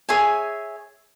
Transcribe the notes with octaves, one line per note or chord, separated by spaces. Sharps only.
G#4 C#5 E5 G#5